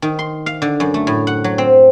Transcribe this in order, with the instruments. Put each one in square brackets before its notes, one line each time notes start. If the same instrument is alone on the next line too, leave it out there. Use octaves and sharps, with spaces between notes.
[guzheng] D#3
C6
F5
D3
F#2
A3
A2
F#5
F#3
C4